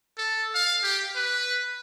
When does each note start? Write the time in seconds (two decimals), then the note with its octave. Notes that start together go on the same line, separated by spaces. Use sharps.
0.18 A4
0.54 F5
0.83 G4
1.15 B4